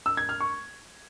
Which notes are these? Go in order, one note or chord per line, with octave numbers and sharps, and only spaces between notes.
E6
G#6
F6
C#6